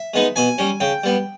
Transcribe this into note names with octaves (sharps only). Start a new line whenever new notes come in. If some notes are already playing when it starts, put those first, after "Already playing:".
Already playing: E5
G#3 B3 D#4
B2 G#5
G3 C#4
C#3 G5
G3 B3